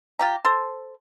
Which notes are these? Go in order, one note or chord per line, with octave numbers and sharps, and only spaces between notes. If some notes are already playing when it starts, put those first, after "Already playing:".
F4 G4 A#5
A4 C5